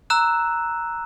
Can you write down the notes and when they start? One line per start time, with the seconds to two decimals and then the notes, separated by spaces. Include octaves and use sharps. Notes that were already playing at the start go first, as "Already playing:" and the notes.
0.10 A#5 E6 F#6 E7